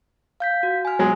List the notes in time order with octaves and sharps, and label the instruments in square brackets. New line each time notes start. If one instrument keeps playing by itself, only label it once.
[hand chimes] F5 G6 B6
F#4
G#5 F6
[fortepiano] F#3 G#3